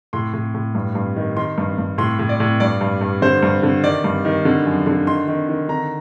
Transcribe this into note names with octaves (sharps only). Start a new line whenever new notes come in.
A2 C6
A2
A2
G2
G2
D#3
D#3 C6
G2
G2
A2 C6
A2
D5
A2
G2 D5
G2
G2
D3 C5
G2
D3
D#3 D5
G2
D#3
D3
F#2
D3
D#3 C6
D#3
D#3
D3 A#5